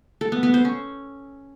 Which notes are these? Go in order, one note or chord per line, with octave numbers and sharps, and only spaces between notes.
A4
B3
B3
C5
C#4